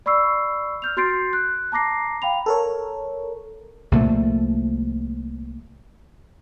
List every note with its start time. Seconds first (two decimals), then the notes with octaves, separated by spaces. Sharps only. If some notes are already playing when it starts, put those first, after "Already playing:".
0.06 D5 B5 C#6 E6 C7
0.82 F6 G6 F7
0.97 F#4 C6 G6 A6 C7 D7
1.33 F#6
1.72 A5 A#5 D6 A#6 C7
2.22 F5 G5 B5 F7
2.46 A4 A#4 C#5
3.92 C2 A#2 F3 A3